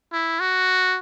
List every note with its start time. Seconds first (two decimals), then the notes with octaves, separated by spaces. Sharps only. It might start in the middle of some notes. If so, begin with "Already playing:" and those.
0.12 E4
0.40 F#4